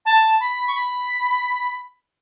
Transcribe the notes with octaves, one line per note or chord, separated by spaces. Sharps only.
A5
B5
C#6
B5